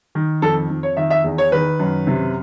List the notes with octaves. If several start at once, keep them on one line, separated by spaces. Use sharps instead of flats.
D#3
F2 A4
F2
C#5
D#3 E5
E5
E2
C#5
D#3 B4
F#2
C3